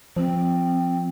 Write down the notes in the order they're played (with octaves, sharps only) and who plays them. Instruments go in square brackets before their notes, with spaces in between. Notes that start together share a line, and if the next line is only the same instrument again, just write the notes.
[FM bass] F3 [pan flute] C4